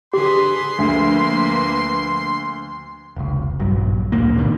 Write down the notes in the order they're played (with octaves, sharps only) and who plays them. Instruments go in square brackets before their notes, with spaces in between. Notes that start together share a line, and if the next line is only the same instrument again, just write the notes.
[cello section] D3 G#4 B4 [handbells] G4 [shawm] C6
[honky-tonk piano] D2 [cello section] F3 A#3 B4
[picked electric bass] F1 C#2
A#1 G2 F#3
D1 D2 A#2 A#3
G#2 B2 D3 D#3